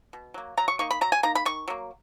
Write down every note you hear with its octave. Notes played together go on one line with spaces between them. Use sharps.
B2
F#3 A#3
F#3 A#5
C#6
A#3 D#4 C#6
B5
F#3 A#5
G#5
A#3 D#4 A#5
B5
D#3 C#6
F#3 A#3